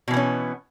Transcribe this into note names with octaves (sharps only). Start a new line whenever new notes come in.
B2 E3 B3 C#4